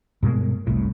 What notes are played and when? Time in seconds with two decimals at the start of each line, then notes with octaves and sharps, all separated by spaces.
0.23 G2 B2 G#3 A#3
0.67 F1 C2 A2